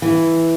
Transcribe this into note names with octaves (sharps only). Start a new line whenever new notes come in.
E3